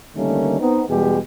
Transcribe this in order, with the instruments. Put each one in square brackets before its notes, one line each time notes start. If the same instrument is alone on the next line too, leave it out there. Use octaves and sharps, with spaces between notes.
[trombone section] D3 D#3 G3 A3 A#3 C#4
B3 C4 D#4
E2 B2 G3 G#3 G4 G#4